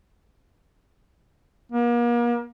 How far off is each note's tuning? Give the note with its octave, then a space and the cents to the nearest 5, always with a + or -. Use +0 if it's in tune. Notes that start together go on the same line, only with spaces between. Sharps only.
A#3 +40